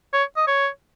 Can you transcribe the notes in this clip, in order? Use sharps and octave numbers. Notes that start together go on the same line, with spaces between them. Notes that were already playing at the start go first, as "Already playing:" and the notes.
C#5
D#5
C#5